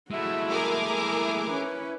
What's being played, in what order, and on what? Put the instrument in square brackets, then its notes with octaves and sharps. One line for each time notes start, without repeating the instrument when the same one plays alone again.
[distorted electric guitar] G#3 A3 [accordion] E4 [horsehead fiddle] F#4 E5
[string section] G#4 A#4 D6
[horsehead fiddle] E5
C#4 B4